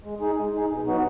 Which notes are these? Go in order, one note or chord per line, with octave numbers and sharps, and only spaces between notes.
G#3
D#4 G#4
G#3
D#4 G#4
B2
F#3 B3 D#4 F#4